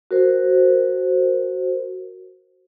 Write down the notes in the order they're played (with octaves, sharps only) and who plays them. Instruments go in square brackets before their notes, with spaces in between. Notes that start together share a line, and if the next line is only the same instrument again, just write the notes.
[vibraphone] F#4 A#4 C5